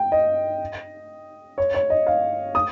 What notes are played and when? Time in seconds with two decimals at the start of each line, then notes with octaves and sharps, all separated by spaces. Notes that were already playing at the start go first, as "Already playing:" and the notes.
Already playing: G5
0.12 D#5
1.58 C#5
1.74 C#5
1.90 D#5
2.07 F5
2.55 D#6